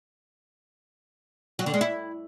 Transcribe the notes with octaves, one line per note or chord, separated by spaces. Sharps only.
F#3
D3
G#3
E4